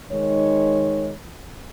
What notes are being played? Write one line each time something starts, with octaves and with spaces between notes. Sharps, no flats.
D#3 G#3 D#4 C#5